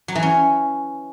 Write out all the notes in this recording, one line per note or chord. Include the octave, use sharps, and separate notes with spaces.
F#3
E3
C#4